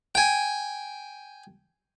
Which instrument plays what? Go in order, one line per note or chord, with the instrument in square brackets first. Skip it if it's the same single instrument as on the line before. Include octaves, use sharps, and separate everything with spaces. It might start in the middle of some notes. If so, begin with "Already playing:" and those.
[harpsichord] G5 G#5